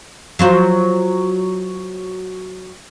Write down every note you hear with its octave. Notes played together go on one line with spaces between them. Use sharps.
F#3 F4 C5